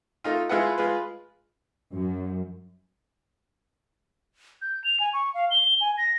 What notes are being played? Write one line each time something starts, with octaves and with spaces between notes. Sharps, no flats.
A3 D#4 F4
G#3 E4 F4 G#4 B4 F#5
G#3 F4 G#4 B4
F#2
G6
F7
G#5
C#6
F5
G7
G#5
A#6